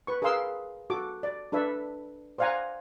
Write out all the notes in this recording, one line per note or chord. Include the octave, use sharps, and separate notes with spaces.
B4 C#6
G#4 A#4 B4 F5 C6 E6
F#4 A4 D6
D5
D4 A4 B4 E5
C5 D5 F5 F#5 G#5 A#5